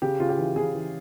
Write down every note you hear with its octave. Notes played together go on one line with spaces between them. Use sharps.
C#3 G4
C#3 F4
G4
E3
C#3 G#4
E3